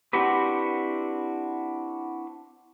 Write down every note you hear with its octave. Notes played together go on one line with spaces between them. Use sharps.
C4 D4 E4 F#4 G4 B4